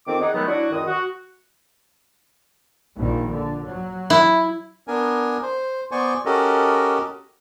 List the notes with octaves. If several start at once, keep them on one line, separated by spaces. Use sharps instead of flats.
F2 D#3 C4 D6
D#4 G#4 F#5
B2 D#3 F#3 G#3 A3 B3
F#3 D4 E4 F#4
C#2 F#2 D#3 D#5 D#6
F#4
A#1 A#2 D#3
D3
F#3
E4
B3 D4 A#4 G#5
C5
B3 C5 D5 G#5 C#6
C#4 F#4 G4 A4 A#4 D#5